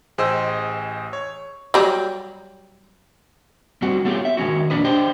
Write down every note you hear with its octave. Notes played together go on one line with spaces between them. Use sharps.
A1 G#4 C5 D#5 G5 E6
C#5
F#3 G3
G3 C4 F#4
A3 B3 C#4 F4 G4 G#4
E5
D#3 G#3 A#3 C#4 F#4
F2 A#2 G3 D4 B4 D#5
D4 G4 C5 D#5 G5